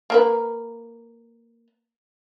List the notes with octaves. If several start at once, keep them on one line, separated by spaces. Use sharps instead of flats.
A#3 A#4 B4